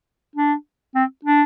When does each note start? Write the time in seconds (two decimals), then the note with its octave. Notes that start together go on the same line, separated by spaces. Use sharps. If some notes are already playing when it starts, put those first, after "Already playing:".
0.36 D4
0.95 C4
1.25 D4